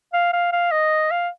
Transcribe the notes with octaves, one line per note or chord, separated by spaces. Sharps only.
F5
F5
F5
D#5
F5